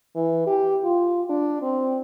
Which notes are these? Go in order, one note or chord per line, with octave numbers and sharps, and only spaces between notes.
E3
G4
F4
D4
C4